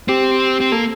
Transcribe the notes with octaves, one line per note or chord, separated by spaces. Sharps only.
C4 G4
C4
A#3 A4